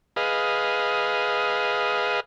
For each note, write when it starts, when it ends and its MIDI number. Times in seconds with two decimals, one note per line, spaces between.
0.16 2.20 68
0.16 2.20 71
0.16 2.20 75
0.16 2.20 77